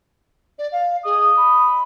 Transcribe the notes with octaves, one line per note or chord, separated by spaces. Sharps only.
D5
F5
G#4 D#5
B5